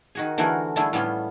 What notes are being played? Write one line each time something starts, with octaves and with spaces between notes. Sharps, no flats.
D#3 F#4 G#4
D3 E3 A3 F#4 G#4 A#4
D3 G3 A3 E4 G#4
A2 G3 B3 C#4 F4